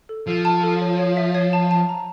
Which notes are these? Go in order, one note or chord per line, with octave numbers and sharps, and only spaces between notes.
A4
F3 A4
A5
A4
C#5
C#5
E5
C#5
A5
A5
A#5